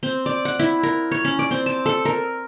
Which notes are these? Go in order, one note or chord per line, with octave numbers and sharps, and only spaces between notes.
C4
D5
F#5
E4
A#4
C#5
C#4
D5
C4
A5
A4
A#4